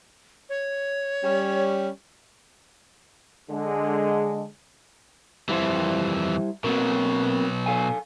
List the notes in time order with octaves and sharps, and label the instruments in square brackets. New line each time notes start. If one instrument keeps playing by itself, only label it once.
[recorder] C#5
[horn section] G3 C#4
[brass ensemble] D3 G#3
[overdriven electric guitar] F2 E3 [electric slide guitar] G3 E4 C5
[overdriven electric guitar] B2 F#3 [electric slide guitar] A#3 C4 A#4
[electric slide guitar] A4 F5 G#5